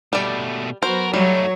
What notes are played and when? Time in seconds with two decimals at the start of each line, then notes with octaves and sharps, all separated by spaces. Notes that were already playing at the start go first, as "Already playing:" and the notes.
0.13 B2 G3 A3 D5
0.83 F#3 B3 F#4 A#4 C5
1.14 F#3 G3 A3 D#4 F#4 C#5